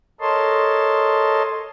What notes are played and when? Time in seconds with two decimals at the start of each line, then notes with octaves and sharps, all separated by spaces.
0.21 A4 A#4 C#5 D#5 A5 C6